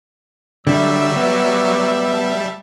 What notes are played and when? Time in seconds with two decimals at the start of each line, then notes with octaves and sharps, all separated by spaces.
0.67 D3 F#3 G3 D5 E5 E6
1.16 B3
2.14 A5